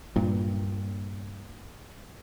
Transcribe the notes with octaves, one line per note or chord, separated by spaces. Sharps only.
G2 A#2